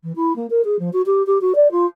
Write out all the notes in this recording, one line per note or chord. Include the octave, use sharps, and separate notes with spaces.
E3
E4
A#3
A#4
G#4
F3
F#4
G4
G4
F#4
D5
F4